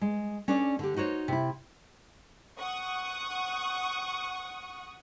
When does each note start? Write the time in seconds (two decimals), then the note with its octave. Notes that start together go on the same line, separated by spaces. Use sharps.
0.01 G#3
0.48 C#4 D4 A4 D5
0.79 D3 G4
0.96 D#4 F#4 C5 C#5
1.28 C3 E4
2.60 F#5 C#6 D#6